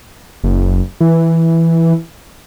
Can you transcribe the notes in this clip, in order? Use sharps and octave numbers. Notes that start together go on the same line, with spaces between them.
F#1
E3